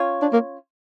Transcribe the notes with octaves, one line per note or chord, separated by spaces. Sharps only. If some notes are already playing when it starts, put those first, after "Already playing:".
Already playing: C#4 F4 C#5
D4
A#3